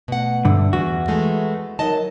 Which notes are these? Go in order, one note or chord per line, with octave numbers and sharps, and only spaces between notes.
B2 A3 F#5
G2 D3 E5 E6
E2 F#4
E3 G#3 A3
F#3 D#4 A#4 D#5 A5